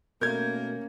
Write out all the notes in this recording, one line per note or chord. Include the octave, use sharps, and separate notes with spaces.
B2 A3 A#3 C#4 A#4 G6 G#6